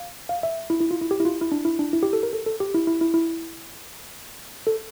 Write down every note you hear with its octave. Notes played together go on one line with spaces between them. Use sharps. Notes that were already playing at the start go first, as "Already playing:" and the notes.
Already playing: F5
F5
E5
E4
E4
F4
E4
G4
E4
F4
E4
D4
E4
D4
E4
G4
A4
A#4
A4
A4
G4
E4
E4
E4
E4
A4